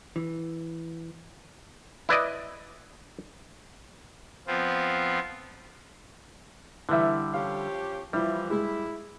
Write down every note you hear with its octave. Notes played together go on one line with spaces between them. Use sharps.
E3
E4 B4 D5 D#5
F3 B3 C4 F4
D3 E3 G3 E5
F3 C#4 G4 F5
E3 F3 G3 E4
G#3 E4